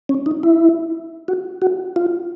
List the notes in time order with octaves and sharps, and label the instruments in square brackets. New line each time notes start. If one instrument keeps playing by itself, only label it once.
[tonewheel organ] C#4
D#4
E4
F#4
F#4
F4